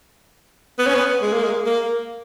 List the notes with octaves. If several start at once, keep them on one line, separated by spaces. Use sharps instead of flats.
B3
C#4
B3
G#3
A#3
G#3
A#3